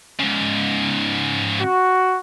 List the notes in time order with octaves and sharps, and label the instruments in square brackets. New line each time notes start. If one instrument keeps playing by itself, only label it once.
[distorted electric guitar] G#2 C#3
[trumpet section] F#4